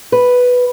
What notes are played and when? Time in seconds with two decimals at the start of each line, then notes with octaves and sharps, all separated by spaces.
0.12 B4